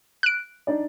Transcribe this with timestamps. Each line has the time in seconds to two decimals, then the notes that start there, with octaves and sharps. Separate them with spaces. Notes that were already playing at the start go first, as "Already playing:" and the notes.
0.23 F#6 D7
0.67 D4 D#4 D5